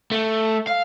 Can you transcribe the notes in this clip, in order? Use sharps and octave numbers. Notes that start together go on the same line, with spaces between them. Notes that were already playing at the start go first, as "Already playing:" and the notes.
A3
F5